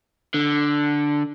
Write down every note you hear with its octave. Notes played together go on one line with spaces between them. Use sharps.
D3